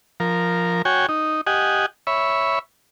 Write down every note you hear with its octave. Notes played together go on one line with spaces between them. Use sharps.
F3 A#4
F#4 C#5 G5 G#5
D#4
G4 D#5 F#5 G#5
C#5 E5 B5